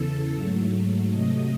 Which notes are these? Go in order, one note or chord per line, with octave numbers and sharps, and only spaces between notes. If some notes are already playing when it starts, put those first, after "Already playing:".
Already playing: E2 C#3 E3 A4
G#2 F#3 A3
C3 F#3 A3 D#5